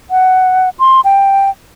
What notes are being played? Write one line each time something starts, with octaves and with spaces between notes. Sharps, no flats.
F#5
C6
G5